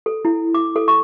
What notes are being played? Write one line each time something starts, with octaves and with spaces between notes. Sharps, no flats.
A4
E4
D6
A4
C#6